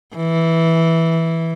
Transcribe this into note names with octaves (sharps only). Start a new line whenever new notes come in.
E3